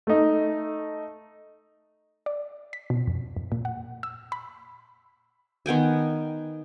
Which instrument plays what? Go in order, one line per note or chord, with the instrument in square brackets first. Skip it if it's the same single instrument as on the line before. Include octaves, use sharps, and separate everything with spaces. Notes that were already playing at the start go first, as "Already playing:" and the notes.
[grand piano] A3 D#4
[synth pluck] D5
B6
B2
F2
F2
A#2
F#5
E6
B5
[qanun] D#3 B3 G5 G#5